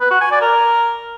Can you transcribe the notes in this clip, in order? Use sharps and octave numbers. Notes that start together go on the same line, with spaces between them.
B4
F#4
G#5
D5
A#4